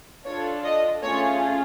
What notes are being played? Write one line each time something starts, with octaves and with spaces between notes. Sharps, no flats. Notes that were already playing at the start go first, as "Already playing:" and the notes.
D4 F4 A4 C#5
D#5
A3 C#4 F4 G#4 C#5